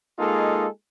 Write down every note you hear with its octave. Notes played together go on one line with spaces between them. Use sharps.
G#3 A#3 D#4 F4 G#4 A4